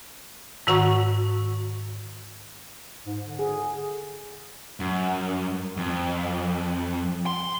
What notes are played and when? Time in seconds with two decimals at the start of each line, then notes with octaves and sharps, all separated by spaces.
0.67 G#2 D#3 F#4 F#5 A#5 C#6
3.06 G#2
3.22 D3
3.39 G#4
4.80 F#2
5.77 F2
7.26 C6